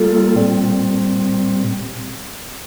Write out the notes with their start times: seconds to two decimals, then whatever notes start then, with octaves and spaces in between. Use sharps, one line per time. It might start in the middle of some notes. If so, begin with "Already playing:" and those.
Already playing: G3 A#3 F4 A4
0.36 A#2 G3 C4